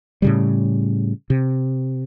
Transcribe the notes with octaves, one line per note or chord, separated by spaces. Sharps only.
A2 C#3 G3
C3